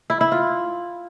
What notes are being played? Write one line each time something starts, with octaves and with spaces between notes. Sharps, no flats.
E4
E4
F4